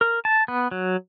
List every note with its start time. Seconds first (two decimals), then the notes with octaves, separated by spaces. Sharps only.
0.01 A#4
0.25 A5
0.48 B3
0.71 F#3